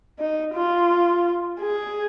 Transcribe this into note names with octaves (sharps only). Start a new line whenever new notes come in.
D#4
F4
G#4